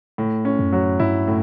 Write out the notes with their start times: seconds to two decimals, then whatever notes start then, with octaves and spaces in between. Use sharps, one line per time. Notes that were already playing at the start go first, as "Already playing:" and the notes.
0.18 A2
0.45 C#4
0.59 F#2
0.72 F#3
1.00 G2 E4
1.27 A2